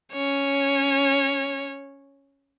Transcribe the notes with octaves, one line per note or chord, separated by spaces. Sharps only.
C#4 C#5